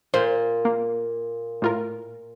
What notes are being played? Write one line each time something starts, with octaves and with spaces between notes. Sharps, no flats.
A#2 C5
A#3
A2 F4 A#4